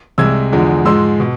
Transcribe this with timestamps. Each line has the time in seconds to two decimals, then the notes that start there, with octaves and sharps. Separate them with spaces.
0.18 C2 C3 G#3 E6 G#6
0.52 E2 D3 F3 G#3
0.85 G#2 F3 G#3 C6 E6
1.20 B2